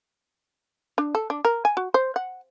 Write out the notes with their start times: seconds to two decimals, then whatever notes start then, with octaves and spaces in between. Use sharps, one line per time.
0.98 D4
1.15 A4
1.30 D4
1.45 A#4
1.65 G#5
1.77 F#4
1.94 C5
2.16 F#5